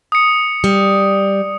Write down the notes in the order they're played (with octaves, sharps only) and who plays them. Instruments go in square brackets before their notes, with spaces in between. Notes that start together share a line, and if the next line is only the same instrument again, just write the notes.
[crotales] D#6 C#7
[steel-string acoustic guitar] G3